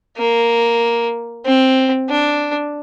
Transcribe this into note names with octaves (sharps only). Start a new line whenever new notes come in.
A#3
C4
D4